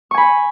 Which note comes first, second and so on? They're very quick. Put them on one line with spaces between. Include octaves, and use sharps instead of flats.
C#6 G#5 B5